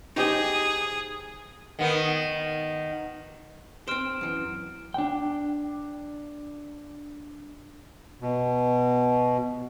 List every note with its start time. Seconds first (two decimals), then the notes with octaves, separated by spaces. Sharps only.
0.16 D#4 G4 G#4 C5
1.79 D#3 B3
3.88 C4 C5 F6 D7 E7
4.21 F#2 E3
4.94 D4 G5
8.21 B2